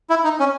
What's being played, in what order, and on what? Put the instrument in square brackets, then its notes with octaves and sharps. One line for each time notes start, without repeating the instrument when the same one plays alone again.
[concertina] E4
D#4
C#4